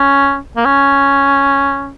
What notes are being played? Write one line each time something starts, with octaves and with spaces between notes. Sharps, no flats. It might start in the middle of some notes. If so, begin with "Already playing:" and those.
Already playing: C#4
A#3
C#4